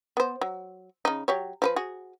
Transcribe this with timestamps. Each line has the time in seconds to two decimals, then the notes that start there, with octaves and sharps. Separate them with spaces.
0.17 B3 C5
0.41 F#3
1.05 C#3 D#4
1.28 F#3 G4 C#5
1.62 F3 A4 B4
1.76 F#4 G#4